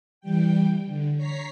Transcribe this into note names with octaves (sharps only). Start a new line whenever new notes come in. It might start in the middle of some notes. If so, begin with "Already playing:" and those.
E3 G3 G5
D3
C#5 A#5 B6 C7